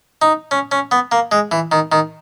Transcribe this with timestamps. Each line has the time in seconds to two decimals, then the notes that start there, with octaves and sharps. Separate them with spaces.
0.22 D#4
0.51 C#4
0.72 C#4
0.91 B3
1.12 A#3
1.32 G#3
1.51 E3
1.72 D#3
1.92 D#3